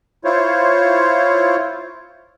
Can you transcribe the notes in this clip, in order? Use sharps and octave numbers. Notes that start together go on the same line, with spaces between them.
E4 F4 C5 C#5